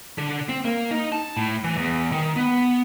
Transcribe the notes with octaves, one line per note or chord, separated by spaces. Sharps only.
D3
C4
A#3
D#4
A5
A2
E3
E2
D#3
B3